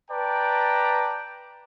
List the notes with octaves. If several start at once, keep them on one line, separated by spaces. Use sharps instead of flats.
B4 D5 G5 A5 A#5